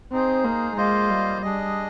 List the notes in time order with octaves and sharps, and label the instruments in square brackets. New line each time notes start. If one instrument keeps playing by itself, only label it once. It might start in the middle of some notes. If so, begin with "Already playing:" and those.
[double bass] C4 [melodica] D#4 G#4 C5
[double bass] A#3
[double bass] G#3 [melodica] A#3 F4 C5 D#5
[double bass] G3
[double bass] G3 [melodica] D4 G#4 D#5